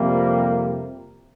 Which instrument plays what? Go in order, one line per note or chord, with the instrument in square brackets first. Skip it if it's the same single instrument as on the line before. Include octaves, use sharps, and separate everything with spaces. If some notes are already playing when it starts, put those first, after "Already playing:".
Already playing: [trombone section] F2 C3 F3 G3 A#3